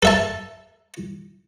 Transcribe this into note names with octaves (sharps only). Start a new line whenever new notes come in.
A4 E5 A5